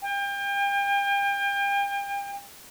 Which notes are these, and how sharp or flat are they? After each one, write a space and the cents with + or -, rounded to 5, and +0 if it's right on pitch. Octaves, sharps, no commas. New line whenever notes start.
G5 +35